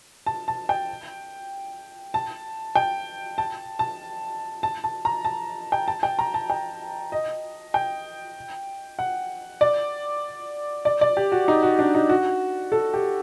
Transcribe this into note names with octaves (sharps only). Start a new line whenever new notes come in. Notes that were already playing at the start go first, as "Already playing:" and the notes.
A5
A5
G5
A5
G5
A5
A5
A5
A5
A#5
A5
G5
A5
G5
A#5
A5
G5
D#5
G5
F#5
D5
D5
D5
G4
F#4
D#4
F#4
D4
D#4
F#4
A4
G4